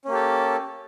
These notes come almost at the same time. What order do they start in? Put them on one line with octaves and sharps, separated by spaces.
C#4 A#3 G4 A4